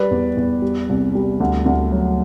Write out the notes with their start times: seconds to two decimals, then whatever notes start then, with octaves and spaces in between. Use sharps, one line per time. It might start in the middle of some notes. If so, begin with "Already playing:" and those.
Already playing: G3 B4 D5
0.11 E2
0.37 E2
0.62 G3
0.89 C2
1.15 G3
1.40 D2
1.66 D2
1.92 F#3